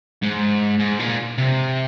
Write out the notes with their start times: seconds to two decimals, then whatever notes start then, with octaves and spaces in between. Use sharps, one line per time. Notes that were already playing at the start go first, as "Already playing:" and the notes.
0.23 G#2
0.80 G#2
0.99 A#2
1.38 C3